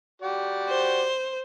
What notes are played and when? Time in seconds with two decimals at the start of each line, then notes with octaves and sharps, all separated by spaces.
0.22 F#4 G4 D5
0.68 C5